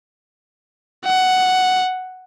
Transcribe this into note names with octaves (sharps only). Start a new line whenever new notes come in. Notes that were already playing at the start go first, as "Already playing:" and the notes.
F#5